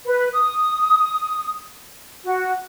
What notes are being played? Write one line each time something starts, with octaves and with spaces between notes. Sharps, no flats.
B4
D#6
F#4